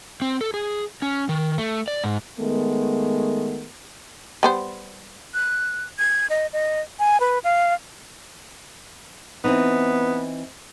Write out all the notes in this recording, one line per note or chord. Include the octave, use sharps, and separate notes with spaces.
C4
A4
G#4
C#4
D#3
A3
D5
G#2
D#3 G#3 A3 B3
G3 B3 C5
F#6
G#6
D#5
D#5
G#5
B4
F5
E3 B3 C4 D#4